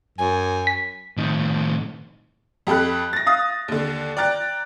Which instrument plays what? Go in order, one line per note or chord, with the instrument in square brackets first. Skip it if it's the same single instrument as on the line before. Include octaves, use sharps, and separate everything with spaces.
[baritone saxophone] F#2 [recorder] G#5
[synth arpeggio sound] B6
[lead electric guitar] A2 D#3
[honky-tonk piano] F2 G4 A4 B5 F#6
A6 A#6
F5 D#6 A6
D#2 D3
D5 G5 A#5 F#6 A6